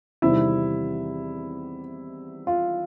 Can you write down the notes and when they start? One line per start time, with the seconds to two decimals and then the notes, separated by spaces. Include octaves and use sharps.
0.22 E2 C3 D#3 G3 E4
2.47 F4